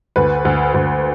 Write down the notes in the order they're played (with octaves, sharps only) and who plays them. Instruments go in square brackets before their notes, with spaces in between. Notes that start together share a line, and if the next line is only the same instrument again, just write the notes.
[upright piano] D2 B4
D2
D2